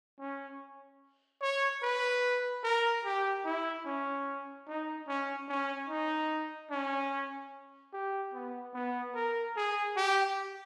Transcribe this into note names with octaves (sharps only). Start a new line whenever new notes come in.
C#4
C#5
B4
A#4
G4
E4
C#4
D#4
C#4
C#4
D#4
C#4
G4
B3
B3
A#4
G#4
G4